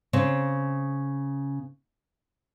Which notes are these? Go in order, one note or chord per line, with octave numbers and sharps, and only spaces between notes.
C#3 C4